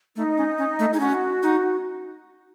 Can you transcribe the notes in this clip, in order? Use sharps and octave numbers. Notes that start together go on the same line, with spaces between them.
A3 D#4
C#4
C#4
A3
D#4 G#4
C#4 F#4
D#4